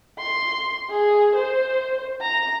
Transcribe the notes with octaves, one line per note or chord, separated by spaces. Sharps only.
C6
G#4
C5
A#5